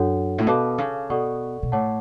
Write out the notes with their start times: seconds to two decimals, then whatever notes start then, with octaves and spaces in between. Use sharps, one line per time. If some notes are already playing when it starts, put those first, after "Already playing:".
Already playing: F#2 D4 F#4 A4 C#5 F#5
0.38 A2
0.47 B2 A4 F5 A5 D6
0.78 C#3
1.10 B2 A4 D5 F#5 C#6
1.63 B2
1.72 A2 C#5 F#5 A5 D6